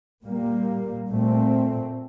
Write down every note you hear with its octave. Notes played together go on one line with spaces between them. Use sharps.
A#2 G3 A#3
A#2 A3 C4